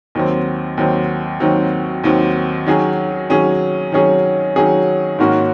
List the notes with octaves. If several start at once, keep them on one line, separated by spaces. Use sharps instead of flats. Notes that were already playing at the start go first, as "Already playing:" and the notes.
D#2 D#3 F#3 C4
D#2 D#3 F#3 C4
D#2 D#3 F#3 C4
D#2 D#3 F#3 C4
D#3 F#3 C#4 G#4
D#3 F#3 C#4 G#4
D#3 F#3 C#4 G#4
D#3 F#3 C#4 G#4
G#2 D#3 A#3 C#4 F#4